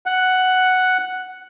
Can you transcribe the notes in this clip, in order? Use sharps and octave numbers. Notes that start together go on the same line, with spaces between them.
F#5